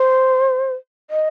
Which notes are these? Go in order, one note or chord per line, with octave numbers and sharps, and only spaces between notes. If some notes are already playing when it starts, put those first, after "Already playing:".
Already playing: C5
D#5